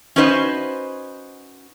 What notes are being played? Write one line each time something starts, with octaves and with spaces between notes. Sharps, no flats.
C#4 D#4 F#4 B4 C5 D#5